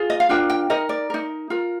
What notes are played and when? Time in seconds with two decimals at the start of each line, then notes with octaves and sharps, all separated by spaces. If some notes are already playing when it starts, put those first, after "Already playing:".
Already playing: F4 G#4
0.10 D#5
0.20 F5
0.29 D4 F4 A#4 G5
0.50 G5
0.70 D#4 A#4 D#5
0.89 D5
1.10 D#4 A#4
1.50 F4 A#4